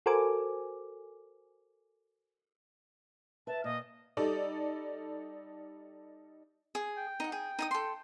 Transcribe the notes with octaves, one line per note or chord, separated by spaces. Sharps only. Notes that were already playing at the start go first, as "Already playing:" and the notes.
F#4 A4 A#4 C5 G#5 D6
B4 E5 A5
A#2 D#5 F5
G3 D#4 A4 D5
G#4
G5
D#4 F#5
G#4 G5
D#4 G#5 D#6
A4 C6